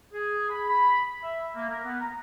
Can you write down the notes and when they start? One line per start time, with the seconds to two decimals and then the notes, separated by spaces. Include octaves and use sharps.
0.14 G#4
0.50 B5
0.68 B5
1.23 E5
1.56 A#3
1.69 A#4
1.84 B3
2.01 A#5